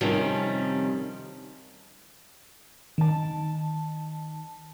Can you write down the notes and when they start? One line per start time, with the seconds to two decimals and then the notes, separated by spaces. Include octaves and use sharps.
0.01 F2 C3 D#3 F3 G3 C#4
2.98 D#3 A5